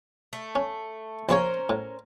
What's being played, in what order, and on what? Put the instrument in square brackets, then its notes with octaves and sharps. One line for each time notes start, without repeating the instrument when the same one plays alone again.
[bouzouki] A3
[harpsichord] C#4
[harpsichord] A#1 C#3 C#5 [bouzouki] C#4 A#4 C5
[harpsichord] A2